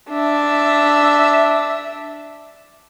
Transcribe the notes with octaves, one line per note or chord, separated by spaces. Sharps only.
D4 E5